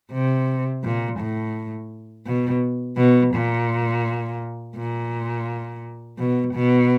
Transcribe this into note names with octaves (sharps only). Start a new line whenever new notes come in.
C3
A#2
A2
B2
B2
A#2
A#2
B2
B2